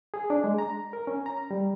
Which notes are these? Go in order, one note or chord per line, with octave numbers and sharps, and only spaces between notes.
G#4
D4
G#3
A#5
A#4
C#4
A#5
G3